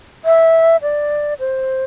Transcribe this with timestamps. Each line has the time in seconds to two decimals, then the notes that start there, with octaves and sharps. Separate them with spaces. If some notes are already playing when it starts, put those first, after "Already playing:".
0.25 E5
0.82 D5
1.40 C5